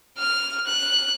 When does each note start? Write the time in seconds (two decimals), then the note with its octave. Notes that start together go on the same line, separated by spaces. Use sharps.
0.18 F6
0.66 F#6